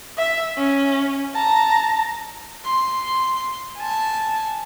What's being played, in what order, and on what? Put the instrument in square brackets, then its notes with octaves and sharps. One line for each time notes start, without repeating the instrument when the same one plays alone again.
[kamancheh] E5
C#4
A5 A#5
[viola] C6
G#5 A5